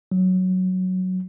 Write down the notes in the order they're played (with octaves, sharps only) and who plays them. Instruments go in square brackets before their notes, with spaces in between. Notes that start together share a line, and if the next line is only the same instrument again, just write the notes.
[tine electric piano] F#3